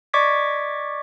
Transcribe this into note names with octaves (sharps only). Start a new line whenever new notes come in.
D5 D#5 C#6 D6 G#6 B6